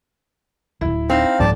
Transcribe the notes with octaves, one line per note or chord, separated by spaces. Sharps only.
D1 G#1 E4
C4 D#4 F5
D#1 C2 G#2 F3 D5 A5